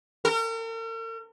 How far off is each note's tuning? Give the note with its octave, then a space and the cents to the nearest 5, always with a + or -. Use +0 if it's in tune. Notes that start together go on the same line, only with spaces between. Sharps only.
A#4 -45